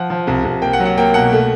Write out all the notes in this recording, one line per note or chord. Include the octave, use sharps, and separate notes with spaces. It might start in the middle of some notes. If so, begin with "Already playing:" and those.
Already playing: F3 F#5
F3
C2
C2
A#3 G5
F#5
F#3
F#5
A#3 G5
B2 F#5
A3